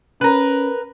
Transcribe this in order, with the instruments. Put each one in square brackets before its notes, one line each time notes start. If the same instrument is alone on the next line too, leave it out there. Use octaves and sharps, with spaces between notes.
[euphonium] C#4 [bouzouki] A#4 B4